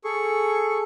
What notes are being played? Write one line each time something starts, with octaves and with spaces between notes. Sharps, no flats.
G#4 A4 C#6